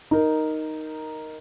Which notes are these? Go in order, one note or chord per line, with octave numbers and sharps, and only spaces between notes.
D#4 A#4